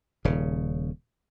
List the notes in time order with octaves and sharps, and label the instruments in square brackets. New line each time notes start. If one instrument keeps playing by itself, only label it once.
[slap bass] D#1 C#3